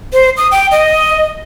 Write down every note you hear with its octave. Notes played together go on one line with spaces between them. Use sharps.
C5
D#6
G5
D#5